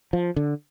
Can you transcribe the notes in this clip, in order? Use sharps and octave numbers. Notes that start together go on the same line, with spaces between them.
F3
D3